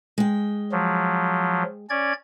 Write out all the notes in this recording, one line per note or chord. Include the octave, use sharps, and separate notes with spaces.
G#3 G5
F3 F#3
C#4 D5 G#6